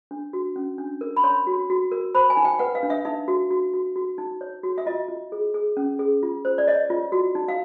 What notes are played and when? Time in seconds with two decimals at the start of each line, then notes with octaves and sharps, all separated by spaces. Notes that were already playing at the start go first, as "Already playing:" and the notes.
0.11 D4
0.33 F#4
0.56 C#4
0.78 D4
1.01 A#4
1.17 B5
1.24 C#5 C6
1.47 F#4
1.70 F#4
1.92 A#4
2.15 C5 B5
2.30 G#5
2.37 D#4
2.45 G5
2.59 B4 F#5
2.75 F5
2.83 D4
2.90 E5
3.05 D#4 E5
3.28 F#4
3.50 F#4
3.74 F#4
3.96 F#4
4.18 D#4
4.41 C#5
4.63 F#4
4.78 E5
4.86 F4 D#5
5.08 F4
5.32 G#4
5.54 G#4
5.77 C#4
5.99 G#4
6.23 F4
6.45 C5
6.58 D5
6.67 C#5 D#5
6.90 F4
7.12 F#4
7.35 D#4
7.48 F5